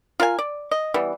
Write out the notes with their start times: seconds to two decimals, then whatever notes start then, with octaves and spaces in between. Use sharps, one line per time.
0.20 F4 A#4 F5 G#5
0.39 D5
0.71 D#5
0.94 E3 G3 B3